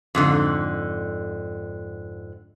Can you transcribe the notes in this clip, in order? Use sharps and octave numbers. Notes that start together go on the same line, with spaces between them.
F2 G#2 D3